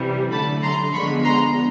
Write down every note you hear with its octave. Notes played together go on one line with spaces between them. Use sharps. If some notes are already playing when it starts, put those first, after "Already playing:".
Already playing: C3 E3 G3
D3 F#3 A3 A5 B5
A#5 C6
D3 F3 G#3 B3 B5 C#6
A#5 C6